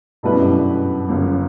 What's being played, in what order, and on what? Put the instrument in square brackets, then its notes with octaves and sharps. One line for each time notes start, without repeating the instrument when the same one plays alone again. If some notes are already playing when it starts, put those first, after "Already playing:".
[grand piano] G2 [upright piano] B2 A3 E4 B4
[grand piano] F#2
G2
[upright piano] G1 F#2 C#3